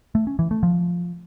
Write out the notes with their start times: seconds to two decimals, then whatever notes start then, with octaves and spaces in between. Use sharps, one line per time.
0.15 A3
0.27 C#4
0.39 E3
0.51 A3
0.63 F3